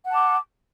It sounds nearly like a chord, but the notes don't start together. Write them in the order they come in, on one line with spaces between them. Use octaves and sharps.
F#5 A5 D6